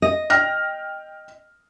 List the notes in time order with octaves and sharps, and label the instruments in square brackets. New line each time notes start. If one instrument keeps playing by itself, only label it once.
[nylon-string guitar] D#5
[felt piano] G5 F6 A#6